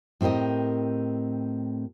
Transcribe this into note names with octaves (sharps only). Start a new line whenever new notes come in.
A2 C4 G4 A#4 D#5